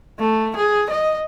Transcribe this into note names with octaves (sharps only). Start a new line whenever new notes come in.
A3
G#4
D#5